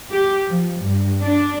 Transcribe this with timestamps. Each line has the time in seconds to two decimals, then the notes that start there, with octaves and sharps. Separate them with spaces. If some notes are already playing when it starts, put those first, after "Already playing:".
0.11 G4
0.49 F3
0.83 G2
1.23 D4